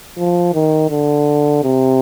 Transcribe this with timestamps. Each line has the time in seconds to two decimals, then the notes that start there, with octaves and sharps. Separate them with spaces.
0.17 F3
0.53 D#3
0.90 D3
1.64 C3